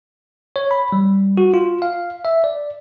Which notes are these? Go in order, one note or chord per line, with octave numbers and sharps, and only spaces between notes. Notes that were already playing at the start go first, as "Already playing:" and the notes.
C#5
B5
G3
F#4
F4
F5
E5
D5